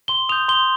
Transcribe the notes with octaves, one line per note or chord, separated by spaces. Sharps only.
C6 G7
D#6 G6 F7
C6 G7